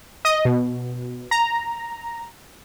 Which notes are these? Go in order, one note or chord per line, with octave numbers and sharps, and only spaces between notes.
D#5
B2
A#5